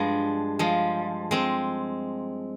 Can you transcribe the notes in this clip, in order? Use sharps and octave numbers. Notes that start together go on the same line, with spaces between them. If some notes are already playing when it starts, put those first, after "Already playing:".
Already playing: G2 F3 G#3
F3 G#3
G#3 C4